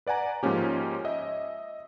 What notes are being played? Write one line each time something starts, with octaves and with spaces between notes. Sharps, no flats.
B4 D5 F#5 G#5 A#5
G#2 F3 A#3 C#4 G4
D#5 E5